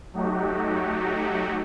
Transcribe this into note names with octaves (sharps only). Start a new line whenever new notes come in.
F#3 A3 D#4 F#4 G4